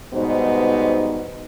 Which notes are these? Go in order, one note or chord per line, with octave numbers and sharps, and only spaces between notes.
G#2 B2 G3 B3 D#4 C5